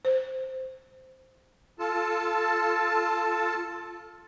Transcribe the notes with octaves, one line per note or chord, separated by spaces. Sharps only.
C5
F4 A4 A5